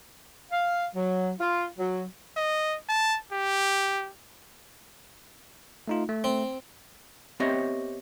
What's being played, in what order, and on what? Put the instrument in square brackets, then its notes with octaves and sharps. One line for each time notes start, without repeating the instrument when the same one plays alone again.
[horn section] F5
F#3
F4
F#3
[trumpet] D#5
A5
G4
[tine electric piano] A3 D#4 F4
A3
[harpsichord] C4
[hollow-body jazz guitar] B3 C4 G4 C#5 D#5 E5